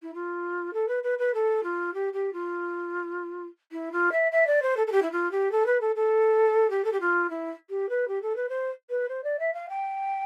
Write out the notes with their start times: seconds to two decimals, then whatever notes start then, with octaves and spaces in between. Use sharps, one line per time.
0.02 E4
0.14 F4
0.73 A4
0.88 B4
1.03 B4
1.18 B4
1.34 A4
1.63 F4
1.93 G4
2.13 G4
2.33 F4
3.71 E4
3.92 F4
4.12 E5
4.31 E5
4.46 D5
4.62 C5
4.76 A4
4.87 A4
4.92 G4
5.02 E4
5.12 F4
5.31 G4
5.51 A4
5.66 B4
5.81 A4
5.95 A4
6.70 G4
6.84 A4
6.92 G4
7.00 F4
7.29 E4
7.69 G4
7.89 B4
8.08 G4
8.22 A4
8.36 B4
8.49 C5
8.90 B4
9.08 C5
9.23 D5
9.39 E5
9.53 F5
9.69 G5